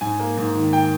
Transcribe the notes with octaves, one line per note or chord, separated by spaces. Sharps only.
G#2 G#5
A#3
G#2
D#3
G5